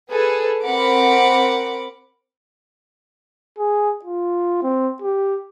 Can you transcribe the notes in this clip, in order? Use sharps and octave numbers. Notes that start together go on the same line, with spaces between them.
G#4 A4 B4
C4 A#4 F#5 B5 D6
G#4
F4
C4
G4